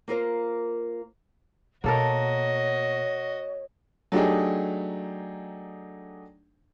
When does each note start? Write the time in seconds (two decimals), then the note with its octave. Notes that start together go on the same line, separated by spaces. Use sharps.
0.08 A#3 F4 A#4 C5
1.84 B2 A#3 F#4 A4 A#4 C#5 D#5
4.12 F#3 A3 D4 D#4 G4 G#4